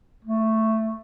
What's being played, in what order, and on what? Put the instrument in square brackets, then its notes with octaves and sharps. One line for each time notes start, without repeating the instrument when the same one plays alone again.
[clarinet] A3